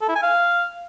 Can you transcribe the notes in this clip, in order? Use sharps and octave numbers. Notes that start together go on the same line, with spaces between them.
A4
E4
G#5
F5